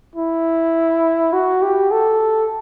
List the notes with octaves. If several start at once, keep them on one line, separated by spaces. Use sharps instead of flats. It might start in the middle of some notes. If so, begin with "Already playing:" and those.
E4
F#4
G4
A4